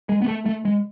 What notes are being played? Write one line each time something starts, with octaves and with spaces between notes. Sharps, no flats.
G#3
B3
A3
A3
G#3